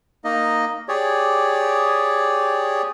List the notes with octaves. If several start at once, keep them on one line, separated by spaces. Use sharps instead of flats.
A#3 D#4 D#5
G4 G#4 C#5 D5